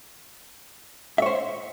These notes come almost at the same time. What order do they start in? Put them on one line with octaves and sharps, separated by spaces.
E5 C#5 C5